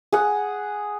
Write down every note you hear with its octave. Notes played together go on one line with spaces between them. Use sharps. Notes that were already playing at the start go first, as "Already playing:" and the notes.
G#4 F#5